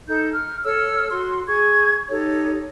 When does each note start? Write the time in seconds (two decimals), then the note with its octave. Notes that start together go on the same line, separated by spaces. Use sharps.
0.07 D#4 A4 G6
0.33 F6
0.64 A4 C#5 E6 F6
1.10 F#4 C6
1.47 G#4 C#6 G#6
2.10 D#4 G4 A4 C#5